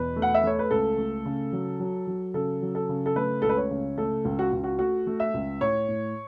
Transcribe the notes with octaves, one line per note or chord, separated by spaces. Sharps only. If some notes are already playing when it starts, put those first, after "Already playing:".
Already playing: E2 B2 B4
A3
F#5
E5
A3 C#5
B4
C#2 A4
A3
C#3
F#3
F#3
F#3
C#3 A4
F#3
A4
C#3
A4
A3 B4
C#2 A4
B4
C#5
C#3
A3 A4
C#2
F#4
C#2
F#4
A3 F#4
A3
E5
C#2
A2 C#5
A2